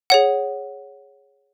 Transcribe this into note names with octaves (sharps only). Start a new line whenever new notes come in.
G#4 C#5 F#5